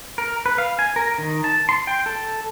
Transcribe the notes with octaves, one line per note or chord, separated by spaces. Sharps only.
A#4
B4
F5
G#5
A#4
D#3
A5
C6
G5
A4